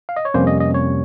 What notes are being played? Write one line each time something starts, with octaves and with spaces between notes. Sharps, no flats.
F5
D#5
C#5
F2 C3 G3 A#3 C#4 C5
D#5
D#5
C#5